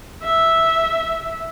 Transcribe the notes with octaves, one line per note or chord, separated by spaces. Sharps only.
E5